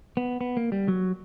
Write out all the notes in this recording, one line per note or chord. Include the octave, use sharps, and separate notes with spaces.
B3
B3
A#3
G3
F#3